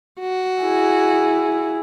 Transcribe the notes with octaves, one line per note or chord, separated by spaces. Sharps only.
F#4
E4 G#4